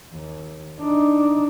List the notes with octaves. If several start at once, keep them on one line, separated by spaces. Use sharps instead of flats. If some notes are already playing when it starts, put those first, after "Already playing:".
D#2
D4 D#4